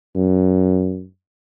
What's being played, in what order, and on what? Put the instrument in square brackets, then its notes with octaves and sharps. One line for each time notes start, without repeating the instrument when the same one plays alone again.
[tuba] F#2